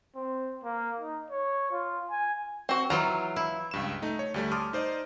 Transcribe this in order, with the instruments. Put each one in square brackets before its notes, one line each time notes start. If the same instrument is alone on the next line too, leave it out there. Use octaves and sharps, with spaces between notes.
[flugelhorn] C4
A#3
D#4
C#5
F4
G#5
[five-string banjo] C4 F#4
[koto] E3 F#3 F4 [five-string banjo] A#5
[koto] E4
[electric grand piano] C#2 G2 E7
A3 D#4
C#5
D2 G3 A3
A5 C6 D6 D#6 F6
D#4 C5 D5 D#5